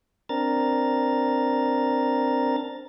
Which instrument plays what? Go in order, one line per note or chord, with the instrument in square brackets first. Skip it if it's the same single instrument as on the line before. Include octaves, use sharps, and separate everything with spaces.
[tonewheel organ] C4 D4 A#4 A#5 A6